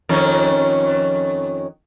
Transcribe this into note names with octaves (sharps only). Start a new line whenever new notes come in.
F2 D#3 C#4